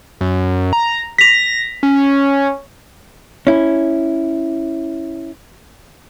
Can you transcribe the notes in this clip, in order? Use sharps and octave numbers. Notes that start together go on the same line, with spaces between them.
F#2
A#5
A#6 B6 F7
C#4
C#4 E4